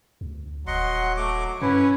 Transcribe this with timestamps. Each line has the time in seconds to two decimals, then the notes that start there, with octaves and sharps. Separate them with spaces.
0.21 D2
0.67 D#1 F#3 D#5 F#5 C6
1.17 A3 D6
1.62 G2 C#4 E4 B4